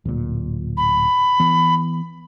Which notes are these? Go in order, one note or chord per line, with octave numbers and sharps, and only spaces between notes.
D1 A#2
B5
E3 B3